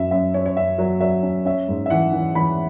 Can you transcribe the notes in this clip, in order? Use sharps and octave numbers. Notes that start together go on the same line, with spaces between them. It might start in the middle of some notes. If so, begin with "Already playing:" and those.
Already playing: F#2 F#3 E5
F#2 E5
C#4 C#5
C#5
F#2 E5
F#3
F#3 E5
C#4
C#4 E5
G#2
E5
E3 F#5
E3
E3 B5